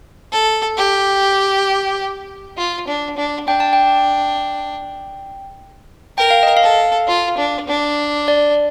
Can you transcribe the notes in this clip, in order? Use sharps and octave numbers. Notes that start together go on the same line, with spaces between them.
A4
G4
F4
D4
D4
D4 G5
A5
G5
A#4 G5
F5
D#5
F5
A4
F4
D4
D4
D5